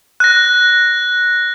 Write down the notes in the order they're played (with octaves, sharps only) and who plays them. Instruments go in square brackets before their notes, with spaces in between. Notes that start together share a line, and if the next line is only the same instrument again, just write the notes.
[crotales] F#6 A#6